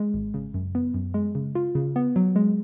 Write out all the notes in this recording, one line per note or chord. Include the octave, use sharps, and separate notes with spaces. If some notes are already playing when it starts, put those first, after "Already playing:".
Already playing: G#3
G#1
C#3
F#2
B3
F#2
G#3
C#3
F4
C#3
B3
F#3
G#3